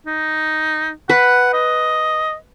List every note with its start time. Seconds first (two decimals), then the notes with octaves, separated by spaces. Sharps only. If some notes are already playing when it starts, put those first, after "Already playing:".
0.07 D#4
1.10 B4 F#5
1.54 D#5